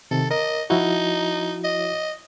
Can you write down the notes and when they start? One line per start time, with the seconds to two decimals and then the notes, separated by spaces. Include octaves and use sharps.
0.11 C3 D#3 A4
0.31 A#4 D#5
0.70 F3 D#4 E4 F#4
1.64 D#5